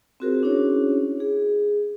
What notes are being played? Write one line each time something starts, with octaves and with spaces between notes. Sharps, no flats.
C4 F4 F#4 G#4 A#4 C5
C#4 D4 E4 F#4 G#4 C#5
G#4